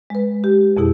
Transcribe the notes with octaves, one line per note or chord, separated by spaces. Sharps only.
G#3 B4
G4
F2 B2 E4 G#4